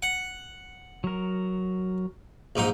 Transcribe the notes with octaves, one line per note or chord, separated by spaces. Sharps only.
F#5
F#3 A#4
A#1 G#2 D#4